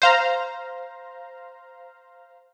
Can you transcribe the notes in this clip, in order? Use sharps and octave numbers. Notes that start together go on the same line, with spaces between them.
C5 F5 A#5